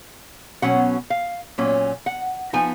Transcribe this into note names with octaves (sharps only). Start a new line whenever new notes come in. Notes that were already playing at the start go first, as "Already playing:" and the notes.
B2 F#3 C#4 F#5
F5
A#2 F#3 C#4
F#5
F3 B3 D#4 G#5